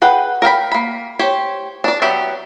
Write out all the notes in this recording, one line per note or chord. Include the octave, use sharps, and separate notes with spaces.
G#4 B4 F#5 G5
A#4 F5 G5 B5
A#3 B5
G4 C5 C#5
D4 D5
F#3 B3 G4 D5 E5